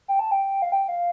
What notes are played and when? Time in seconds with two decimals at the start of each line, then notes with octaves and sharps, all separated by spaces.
0.08 G5
0.19 A5
0.31 G5
0.62 F5
0.72 G5
0.88 F5